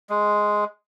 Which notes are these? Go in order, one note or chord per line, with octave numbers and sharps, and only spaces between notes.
G#3